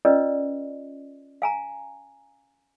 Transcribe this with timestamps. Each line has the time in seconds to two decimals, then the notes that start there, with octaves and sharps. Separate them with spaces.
0.05 C#4 F4 A#4 B4 D5 D#5
1.42 F5 G#5 A#5